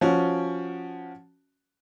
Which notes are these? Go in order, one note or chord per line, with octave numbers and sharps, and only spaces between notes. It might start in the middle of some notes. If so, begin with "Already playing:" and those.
F3 C#4 F#4